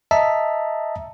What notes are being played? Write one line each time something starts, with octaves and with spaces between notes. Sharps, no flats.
D#5 E5 A5 A#5